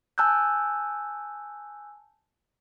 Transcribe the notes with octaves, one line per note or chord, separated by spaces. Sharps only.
G#5 A5 E6 F#6 G6